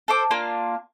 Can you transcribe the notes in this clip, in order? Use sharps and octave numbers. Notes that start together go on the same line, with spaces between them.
A4 C5 D6
A#3 D4 F4